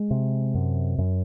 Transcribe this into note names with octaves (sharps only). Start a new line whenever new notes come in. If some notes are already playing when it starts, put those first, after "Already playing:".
Already playing: G#3
C3
F#2
F#2